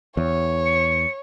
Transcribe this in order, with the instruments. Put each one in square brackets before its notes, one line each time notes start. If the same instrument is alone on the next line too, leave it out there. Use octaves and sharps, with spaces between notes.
[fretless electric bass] E2 [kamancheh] C#5
[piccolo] C#7